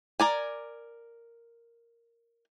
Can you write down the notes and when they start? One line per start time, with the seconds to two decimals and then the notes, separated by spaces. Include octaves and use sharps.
0.20 A#4 D5 G#5